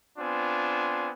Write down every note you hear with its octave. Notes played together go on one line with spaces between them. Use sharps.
B3 C4 D4 F4 G#5